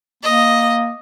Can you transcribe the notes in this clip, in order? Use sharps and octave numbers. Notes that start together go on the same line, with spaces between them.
A#3 D#5